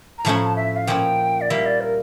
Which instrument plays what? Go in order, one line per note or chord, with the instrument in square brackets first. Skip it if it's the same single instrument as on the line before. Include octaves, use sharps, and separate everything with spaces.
[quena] A#5
[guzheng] A2 F3 A3 C#4 E4 [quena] A5
[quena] A#5
A5
E5
F5
[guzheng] A#2 F3 C#4 E4 [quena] G5
[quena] D5
[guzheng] G3 A#3 E4 [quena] E5
[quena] D5
A#4